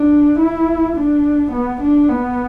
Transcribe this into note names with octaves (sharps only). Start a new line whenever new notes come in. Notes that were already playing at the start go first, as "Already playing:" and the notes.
Already playing: D4
E4
D4
B3
D4
B3